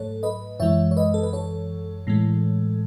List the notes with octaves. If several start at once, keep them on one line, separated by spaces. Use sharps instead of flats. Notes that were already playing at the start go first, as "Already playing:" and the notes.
Already playing: G#2 F#3 A3 A4 C#5
B4 D#5
F#2 E3 G#3 C#5 E5
C#5
B4 D#5
A4
B4
A4 C#5
A2 E3 G#3